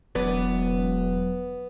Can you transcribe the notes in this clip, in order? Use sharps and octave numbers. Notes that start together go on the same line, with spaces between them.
E1 F#3 B3 B4 D5